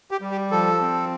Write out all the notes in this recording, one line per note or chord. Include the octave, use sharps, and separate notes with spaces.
G4
G3
G4
F3 A4
C4